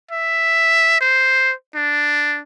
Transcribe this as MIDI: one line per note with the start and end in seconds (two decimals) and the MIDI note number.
0.11 0.99 76
1.01 1.53 72
1.75 2.40 62